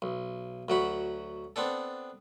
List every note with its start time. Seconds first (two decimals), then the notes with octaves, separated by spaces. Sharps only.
0.02 B1
0.69 D2 F#3 F#4 B5
1.56 B3 C4 D4 A4